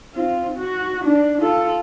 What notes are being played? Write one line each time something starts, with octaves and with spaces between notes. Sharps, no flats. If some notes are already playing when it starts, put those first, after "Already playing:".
C4 F4
F#4
D4
F4 A4